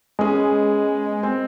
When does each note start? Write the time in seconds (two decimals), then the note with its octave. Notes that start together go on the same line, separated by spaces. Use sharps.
0.19 G#3 B3 C#4 G#4
1.23 C4